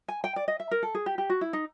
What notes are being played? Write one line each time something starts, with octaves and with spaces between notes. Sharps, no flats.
G#5
G5
D5
D#5
E5
A#4
A4
G#4
G4
G4
F#4
E4
D#4